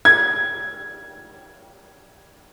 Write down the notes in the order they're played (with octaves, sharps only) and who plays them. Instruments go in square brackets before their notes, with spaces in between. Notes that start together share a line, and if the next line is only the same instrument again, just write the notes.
[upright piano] G#6